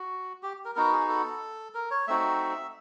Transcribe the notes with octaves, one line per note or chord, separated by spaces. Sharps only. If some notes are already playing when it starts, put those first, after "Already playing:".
Already playing: F#4
G4
A#4
B3 D#4 F#4 A#4
G#4
A4
A#4
C#5
A3 C4 D#4 F#4 E5